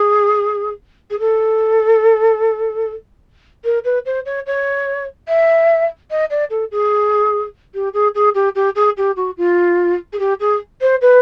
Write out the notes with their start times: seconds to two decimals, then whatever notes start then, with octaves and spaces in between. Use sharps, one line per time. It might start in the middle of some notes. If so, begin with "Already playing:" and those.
Already playing: G#4
1.10 G#4
1.19 A4
3.65 A#4
3.85 B4
4.06 C5
4.26 C#5
4.47 C#5
5.28 E5
6.11 D#5
6.30 D5
6.50 A4
6.72 G#4
7.74 G4
7.94 G#4
8.15 G#4
8.35 G4
8.55 G4
8.76 G#4
8.97 G4
9.16 F#4
9.37 F4
10.13 G#4
10.19 G4
10.40 G#4
10.81 C5
11.01 B4